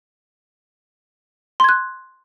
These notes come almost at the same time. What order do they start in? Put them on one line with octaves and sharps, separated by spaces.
C6 G#6 F#6